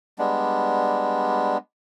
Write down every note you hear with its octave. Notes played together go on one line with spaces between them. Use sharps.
G3 G#3 B3 D4